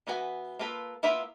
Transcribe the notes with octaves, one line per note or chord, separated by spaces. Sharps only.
E3 B3 F#4 G#5
A#3 F4 A4 B4
A#3 B3 E4 F4 E5